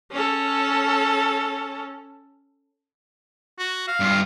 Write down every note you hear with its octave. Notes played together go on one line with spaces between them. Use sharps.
C#4 A4
F#4
F5
G2 F4